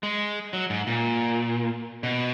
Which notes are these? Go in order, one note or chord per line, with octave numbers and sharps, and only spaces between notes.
G#3
F#3
G#2
A#2
B2